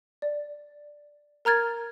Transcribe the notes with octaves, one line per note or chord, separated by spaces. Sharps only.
D5
A#4 A#5 F6 G#6 A6